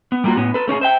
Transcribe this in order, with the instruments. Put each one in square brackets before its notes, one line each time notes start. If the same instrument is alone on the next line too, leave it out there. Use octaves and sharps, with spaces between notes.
[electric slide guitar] B3
G3 A3 A#3 D#4 F4 F#4
A2 B3 C#4
A4 B4
A3 C#4 D#4 G#4
C5 E5 G5